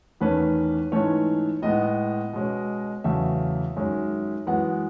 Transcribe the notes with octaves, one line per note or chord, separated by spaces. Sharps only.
E2 D#3 A3 C#4 B4
G#2 E3 A3 C#4 C#5
A2 G#3 B3 D#5
B2 G#3 C#4
E2 C#3 F#3 A3 E5
F#2 D#3 G#3 C#4
F#2 E3 G#3 B3 F#5